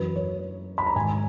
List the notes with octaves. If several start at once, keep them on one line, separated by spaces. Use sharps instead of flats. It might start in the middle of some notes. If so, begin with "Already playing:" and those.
Already playing: F#2 E3 B4
C#5
B5
A#5
G#2 D#3 G#5